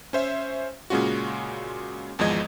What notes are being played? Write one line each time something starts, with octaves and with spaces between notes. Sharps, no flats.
C#4 C5 E5
A#2 C#3 G#3 C#4 F4 F#4
G#1 E2 F3 G#3 D#5 G#6